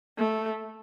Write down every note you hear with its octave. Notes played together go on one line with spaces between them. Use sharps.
A3